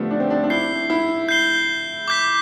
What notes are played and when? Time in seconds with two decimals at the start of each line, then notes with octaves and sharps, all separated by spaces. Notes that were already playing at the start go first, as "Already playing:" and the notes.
Already playing: D3 F3 G3 A3 B3
0.11 D4
0.20 C4
0.30 D4
0.43 D4
0.50 E4 G6 C7 G7
0.90 E4
1.29 G6 C7 G7
2.08 D6 G6 B6